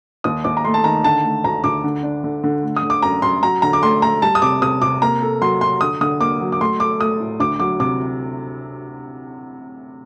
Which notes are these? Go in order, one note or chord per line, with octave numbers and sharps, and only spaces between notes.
D#2 D#6
D#2 D6
A#5
A3 C6
A5
D#3 A#5
D3 A5
A3
D2 A#5
D2 D6
D3
D4
D3
D3
A3
D#6
D3
D6
F#2 A#5
F#2 C6
F#3 A#5
D3 A#5
D6
A3 C6
A3 A#5
G3 A5
D#6
C3 D6
C3 D#6
C3 D6
A#3 A#5
A4
F#3 C6
F#4 C6
D3 D#6
D3 D#6
A#3 D6
F#3
D6
A3 C6
A4 D6
A3 D#6
A2
D2 D6
F#3 D6
C3 D6